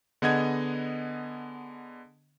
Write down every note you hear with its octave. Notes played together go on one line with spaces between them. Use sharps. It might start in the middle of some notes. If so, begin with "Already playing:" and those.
D3 B3 G#4 D#5 F#5 G#6